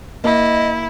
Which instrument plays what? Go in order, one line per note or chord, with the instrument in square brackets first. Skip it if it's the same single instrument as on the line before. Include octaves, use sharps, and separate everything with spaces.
[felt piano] A#3 [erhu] E4 [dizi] D#5